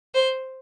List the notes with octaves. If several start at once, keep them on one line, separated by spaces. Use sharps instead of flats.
C5